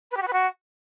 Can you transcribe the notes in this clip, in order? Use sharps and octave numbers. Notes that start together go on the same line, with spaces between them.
B4
G4
F#4
B4
F#4